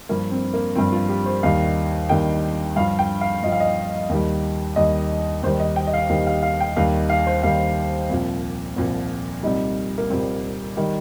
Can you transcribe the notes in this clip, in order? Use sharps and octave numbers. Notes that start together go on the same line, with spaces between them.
G2 F3 A#3
C4
A#3
G2 F3 C4
F4
G4
C5
D#2 D#3 G3 F5
D#2 D#3 G3 G5
G2 F3 F5
G5
F5
G2 F3 D#5
F5
D#5
D#2 D#3 G3
D#2 D#3 G3 D#5
D#2 D#3 G3 C5
D#5
G5
D#5
F5
D#2 D#3 G3 G4
F5
F5
G5
D#2 D#3 G3 F5
F5
C5
D#2 D#3 G3 F5
C2 A#2 F3
C2 A#2 F3
C2 A#2 G3 D#4
A#3
C2 A#2 G3 C4
D#3 G3